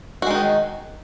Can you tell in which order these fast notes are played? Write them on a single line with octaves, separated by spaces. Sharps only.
F#4 G#3 D#4 D#3